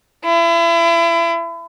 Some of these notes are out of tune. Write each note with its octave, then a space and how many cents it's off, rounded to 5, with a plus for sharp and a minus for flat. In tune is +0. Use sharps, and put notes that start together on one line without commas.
E4 +35